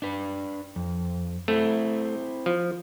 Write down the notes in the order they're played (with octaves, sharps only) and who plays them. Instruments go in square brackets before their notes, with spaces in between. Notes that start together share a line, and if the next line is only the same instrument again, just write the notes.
[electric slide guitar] D4 B4
F2
[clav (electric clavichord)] A3 [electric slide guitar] C4 E4
[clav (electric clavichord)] F3